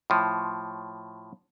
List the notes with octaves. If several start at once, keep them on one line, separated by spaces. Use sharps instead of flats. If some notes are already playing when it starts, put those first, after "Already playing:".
A2 F3